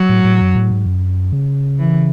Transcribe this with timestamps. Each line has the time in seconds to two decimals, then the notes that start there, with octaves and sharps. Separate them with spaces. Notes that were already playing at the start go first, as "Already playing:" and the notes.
Already playing: F#3
0.09 A2
0.24 A2
0.40 F#2
0.55 A2
0.70 G#2
0.86 F#2
1.32 C#3
1.79 E3